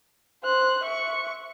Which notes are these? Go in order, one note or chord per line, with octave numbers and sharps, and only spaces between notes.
C5 F#6
E5 C#6